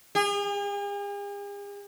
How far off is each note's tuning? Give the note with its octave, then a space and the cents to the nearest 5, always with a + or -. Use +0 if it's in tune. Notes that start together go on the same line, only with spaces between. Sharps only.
G#4 -45